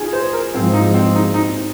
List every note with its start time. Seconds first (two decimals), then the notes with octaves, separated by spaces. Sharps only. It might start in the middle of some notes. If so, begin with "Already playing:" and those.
Already playing: D#4 F4 G#4
0.13 C5
0.33 A#4
0.54 G#2 F3 G#3 C4
0.74 D#4
0.94 C4
1.15 D#4
1.34 D#4